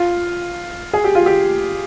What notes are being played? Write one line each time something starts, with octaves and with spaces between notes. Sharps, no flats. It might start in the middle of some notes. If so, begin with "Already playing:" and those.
Already playing: F4
G#4
G4
F4
G4